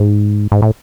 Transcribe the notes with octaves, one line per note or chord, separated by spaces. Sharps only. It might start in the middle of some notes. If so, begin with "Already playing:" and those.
Already playing: G#2
G#2
A2